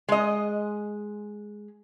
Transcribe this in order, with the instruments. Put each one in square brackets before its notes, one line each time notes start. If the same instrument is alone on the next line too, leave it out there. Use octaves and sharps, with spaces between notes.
[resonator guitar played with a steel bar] G#3 D#5